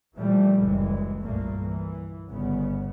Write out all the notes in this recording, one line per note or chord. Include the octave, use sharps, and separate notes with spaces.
A#2 E3 F3 G3 A3
F#1 D2 E3 G#3
C2 G2 A#2 A3 A#3
E3
G1 C#3 B3